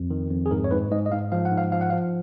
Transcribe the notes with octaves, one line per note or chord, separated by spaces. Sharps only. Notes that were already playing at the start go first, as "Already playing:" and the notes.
Already playing: F2
D#3
F2
G#4
G#2 A#4
C#5
G#2 B4
G#2 D#5
D#5
G#2 F5
F3 F5
F#5
G#2
F5
F3 F5
F#5
F3 F5